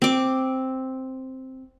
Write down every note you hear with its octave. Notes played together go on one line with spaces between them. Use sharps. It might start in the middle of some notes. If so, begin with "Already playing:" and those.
C4 D6